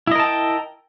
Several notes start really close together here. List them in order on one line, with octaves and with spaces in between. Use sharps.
E4 D#5 A#4 A5 G5